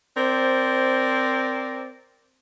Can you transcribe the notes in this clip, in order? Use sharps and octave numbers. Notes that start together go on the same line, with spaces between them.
C4 A#4 C5 D5